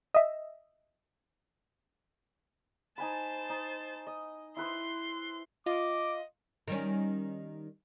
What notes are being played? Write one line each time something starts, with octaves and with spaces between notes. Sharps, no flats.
D#5 E5
D#4 C5 G#5 A5 B5
D#4
D#5
E4 B4 C5 C6
F4 D#5 D6
D#3 G3 C#4